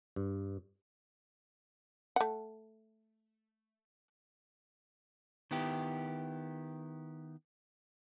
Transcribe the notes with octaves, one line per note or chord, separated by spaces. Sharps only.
G2
A3 F#5
D#3 B3 E4 G4